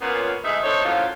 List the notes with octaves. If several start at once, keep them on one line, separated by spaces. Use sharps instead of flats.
A#2 B3 C#4
D2 G#3 D#4 G#4 E5
C4 D4 D#4 A4 C5 C#5
F#2 A2 F3 F#3 F4